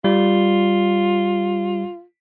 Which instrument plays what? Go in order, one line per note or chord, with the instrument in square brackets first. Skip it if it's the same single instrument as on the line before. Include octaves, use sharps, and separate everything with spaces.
[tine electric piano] G3 [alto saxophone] F4